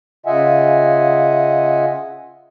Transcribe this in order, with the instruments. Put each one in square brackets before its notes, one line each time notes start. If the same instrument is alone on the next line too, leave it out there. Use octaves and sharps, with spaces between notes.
[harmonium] C#3 F4 D#5 E5 F#5 G#5